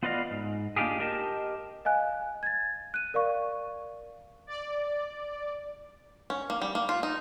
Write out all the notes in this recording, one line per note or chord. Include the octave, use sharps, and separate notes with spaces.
B3 F4 B4 D5 D#5 F5
G#2
A#3 D4 D#4 F4 G4 G#4
G4 A#4 D#5 G5 A5
D#5 F5 G#5 F#6
G#6 A6
F#6 D#7
A#4 D5 F5 C#6
D5
C#4
A#3
G3
A#3
F4
D#4